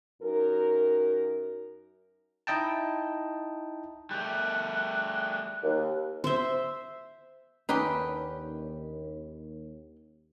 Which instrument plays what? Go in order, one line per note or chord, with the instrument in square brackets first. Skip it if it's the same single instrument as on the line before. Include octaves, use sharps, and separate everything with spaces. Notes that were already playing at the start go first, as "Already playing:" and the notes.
[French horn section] F#2 D#4 A#4
[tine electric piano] D#4 E4 D#5 G5 A5
[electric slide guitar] G3 A3 [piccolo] F#6
[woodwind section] D#2
[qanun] C5 E5
[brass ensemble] D#2 [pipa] D3 D#4 G4 [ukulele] C#4 [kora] B4